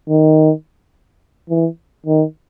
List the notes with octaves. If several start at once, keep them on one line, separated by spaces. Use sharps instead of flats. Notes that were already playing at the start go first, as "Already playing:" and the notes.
D#3
E3
D#3